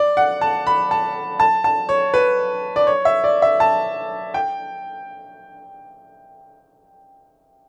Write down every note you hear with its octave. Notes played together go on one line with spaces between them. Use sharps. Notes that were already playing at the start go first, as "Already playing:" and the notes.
Already playing: D5
F#5
A5
B5
A5
A5
A5
C#5
B4
D5
C#5
E5
D5
E5
A5
G5